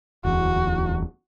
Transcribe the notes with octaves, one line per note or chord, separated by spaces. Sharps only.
D1 E2 F#4